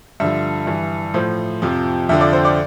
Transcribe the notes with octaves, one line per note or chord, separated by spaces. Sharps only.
G2 D3 F3 E5
G2 E3
A2 F3 C5
F2 C3 F3
F2 D3 F3 E5
D5
C5
D5